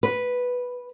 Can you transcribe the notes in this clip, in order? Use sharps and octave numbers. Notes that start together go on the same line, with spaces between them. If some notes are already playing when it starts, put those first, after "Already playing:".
B4